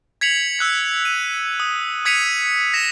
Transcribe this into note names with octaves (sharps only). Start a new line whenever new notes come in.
G#6 B6 C#7 F7 F#7
E6 F#6 B6
D#7
D#6
D#6 G#6 B6 C#7 D#7 F7
A#6 B6 E7